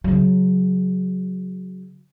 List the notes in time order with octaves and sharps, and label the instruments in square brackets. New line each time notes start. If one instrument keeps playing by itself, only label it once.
[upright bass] C#3 F#3